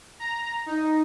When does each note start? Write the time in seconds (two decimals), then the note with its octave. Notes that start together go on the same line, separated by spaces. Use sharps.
0.20 A#5
0.66 D#4